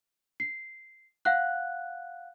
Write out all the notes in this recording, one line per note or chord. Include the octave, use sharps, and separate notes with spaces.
C7
F5 F#5 F#6